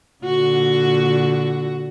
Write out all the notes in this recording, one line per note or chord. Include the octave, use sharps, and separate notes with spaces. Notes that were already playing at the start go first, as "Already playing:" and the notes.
A#2 D3 F#4